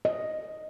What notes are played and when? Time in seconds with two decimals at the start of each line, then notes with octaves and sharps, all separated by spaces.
0.05 D#5